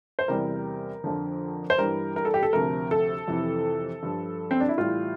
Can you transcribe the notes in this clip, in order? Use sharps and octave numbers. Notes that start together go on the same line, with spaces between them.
C5
E2 C3 G3 A#4
F2 D3 F3
C5
G2 E3 G3 A#4
A#4
A4
G4
A4
D2 C3 F3 A#4
A4
F2 C3 E3
G2 F3
C4
D4
E4
A2 E3 G3 F4